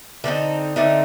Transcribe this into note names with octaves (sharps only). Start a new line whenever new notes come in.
D3 A3 C4 D#4 A4
D3 A3 C4 D#4